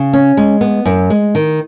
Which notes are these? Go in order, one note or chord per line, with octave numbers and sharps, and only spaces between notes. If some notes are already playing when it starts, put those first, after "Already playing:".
Already playing: C#3
C#4
G#3
B3
F#2
G#3
D#3